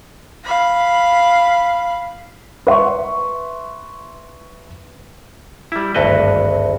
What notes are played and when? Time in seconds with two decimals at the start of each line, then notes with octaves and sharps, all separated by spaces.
0.44 F5 B5
2.67 B4 E5 C6 C#6
5.72 G3 E4
5.95 G#1 D2 G2 F#4 B4 D#5